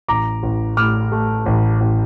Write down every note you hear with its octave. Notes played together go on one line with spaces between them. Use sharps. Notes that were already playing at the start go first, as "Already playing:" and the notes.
A1 A#5 D6
A1
A2 D6 F6
A3
A1
A1